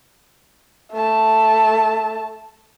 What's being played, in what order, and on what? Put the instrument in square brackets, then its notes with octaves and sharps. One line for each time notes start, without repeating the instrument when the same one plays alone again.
[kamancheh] A3 A5